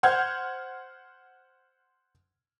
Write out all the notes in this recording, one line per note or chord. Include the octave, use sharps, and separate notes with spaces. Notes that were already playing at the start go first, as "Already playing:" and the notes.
C5 F#5 F6 G6 G#6